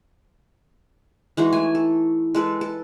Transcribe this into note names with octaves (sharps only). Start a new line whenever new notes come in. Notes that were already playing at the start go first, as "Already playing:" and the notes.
E3 G#3 D#4 F#4
A3 G#5
A4
G#3 A4 B4
A4